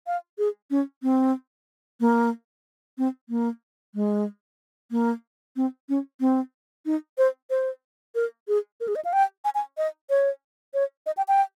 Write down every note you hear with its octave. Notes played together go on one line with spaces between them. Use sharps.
F5
G#4
C#4
C4
A#3
C4
A#3
G#3
A#3
C4
C#4
C4
D#4
C5
C5
A#4
G#4
A#4
G#4
D#5
F5
G5
G#5
G#5
D#5
C#5
C#5
D#5
G5
G5